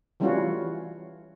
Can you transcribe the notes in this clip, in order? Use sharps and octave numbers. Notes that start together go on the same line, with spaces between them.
E3 G3 A3 C#4 F4 F#4